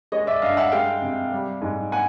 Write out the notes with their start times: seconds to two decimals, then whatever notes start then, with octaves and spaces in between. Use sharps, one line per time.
0.12 G#3 C#5 D#5
0.27 D5 E5
0.42 G2 D#5 F5
0.57 E5 F#5
0.72 G#3 F5 G5
1.02 C3
1.32 G3
1.62 G#2
1.92 B3 F#5 G#5